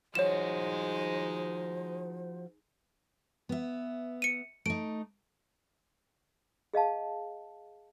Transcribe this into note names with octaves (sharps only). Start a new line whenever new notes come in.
F3 G#3 D#4 F#4 C5 C#5 E7
B3 E5
C#7 D#7
A3 D#4 D7
G#4 D#5 F5 A5